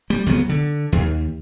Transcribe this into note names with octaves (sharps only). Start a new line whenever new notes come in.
G3
C#2 F#3 G#3 B3
D3
D#2